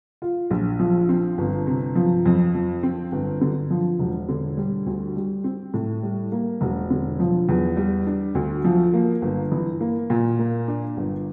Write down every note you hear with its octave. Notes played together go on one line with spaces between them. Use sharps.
F4
A#1
F3
C4
G1
C3
F3
F2
F3
C4
G1
D3
F3
E1
D3
G3
D2
G3
C4
A2
G3
A#3
E1
D3
F3
E2
G3
D4
D2
F3
A#3
G1
E3
A#3
A#2
A#3
D4
G1